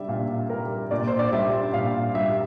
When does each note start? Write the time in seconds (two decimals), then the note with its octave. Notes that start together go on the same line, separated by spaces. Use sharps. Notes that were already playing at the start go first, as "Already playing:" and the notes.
Already playing: G3 D5 E5
0.08 A#2 F5
0.50 G3 A#4
0.91 A#2 D5
1.07 C5
1.19 D5
1.32 G3 E5
1.73 A#2 F5
2.15 G3 E5